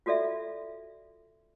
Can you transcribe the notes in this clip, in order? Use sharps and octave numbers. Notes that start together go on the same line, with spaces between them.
F4 F#4 A4 D5 E5